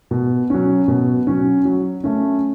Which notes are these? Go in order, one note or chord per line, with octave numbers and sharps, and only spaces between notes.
B2
F#3 C#4
B2
F#3 C#4
F#3
A3 C#4